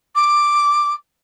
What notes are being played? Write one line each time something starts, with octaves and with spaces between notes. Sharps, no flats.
D6